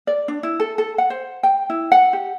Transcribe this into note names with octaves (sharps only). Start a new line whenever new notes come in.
D5
D4
E4
A4
A4
F#5
C5
G5
E4
F#5
G4